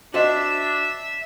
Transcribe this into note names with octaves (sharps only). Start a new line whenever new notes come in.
D4 F#4 C5 D#5 E5